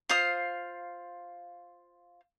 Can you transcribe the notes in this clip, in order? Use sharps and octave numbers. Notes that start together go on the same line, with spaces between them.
F4 C5 F5 D#6